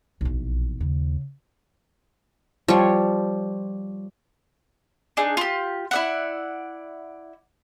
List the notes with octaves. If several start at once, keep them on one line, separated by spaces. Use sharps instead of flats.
B1 E3
A#1
D#2 C#3
F3 G3 C#5
D4 D#4 G#4
F4 G4
E4 D5 F#5